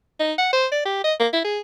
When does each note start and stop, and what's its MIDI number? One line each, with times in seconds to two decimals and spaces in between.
0.20 0.33 63
0.38 0.51 78
0.53 0.67 72
0.71 0.80 74
0.85 1.00 67
1.04 1.14 75
1.19 1.28 58
1.33 1.40 64
1.44 1.60 68